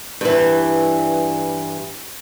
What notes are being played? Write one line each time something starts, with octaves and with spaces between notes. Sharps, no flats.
G2 E3